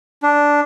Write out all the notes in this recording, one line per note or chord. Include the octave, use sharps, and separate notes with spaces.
D4